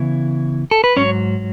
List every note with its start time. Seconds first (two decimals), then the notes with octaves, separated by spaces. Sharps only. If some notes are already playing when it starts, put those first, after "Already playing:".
Already playing: C#3 E3 B3 E4
0.71 A4
0.84 B4
0.97 G#2 F#3 C#4 C#5